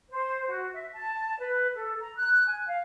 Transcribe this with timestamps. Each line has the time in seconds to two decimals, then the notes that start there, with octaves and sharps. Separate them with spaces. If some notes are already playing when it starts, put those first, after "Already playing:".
0.10 C5
0.49 F#4
0.74 E5
0.93 A5
1.40 B4
1.75 A4
2.00 A#5
2.16 F#6
2.46 G#5
2.67 F5